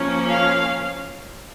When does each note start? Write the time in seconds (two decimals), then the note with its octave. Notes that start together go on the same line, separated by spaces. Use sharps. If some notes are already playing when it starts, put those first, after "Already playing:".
Already playing: F3 A#3 C#4
0.30 F5